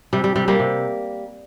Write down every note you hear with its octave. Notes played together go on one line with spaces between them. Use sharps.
C3 G3
G3
C3 G3
G3 A#3
C3